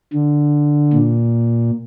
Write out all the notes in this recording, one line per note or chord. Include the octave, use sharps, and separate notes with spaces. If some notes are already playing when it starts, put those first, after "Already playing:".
D3
A#2